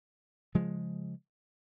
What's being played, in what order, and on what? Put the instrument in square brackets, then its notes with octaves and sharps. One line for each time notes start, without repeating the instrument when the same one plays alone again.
[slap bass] C#3 F3 G#3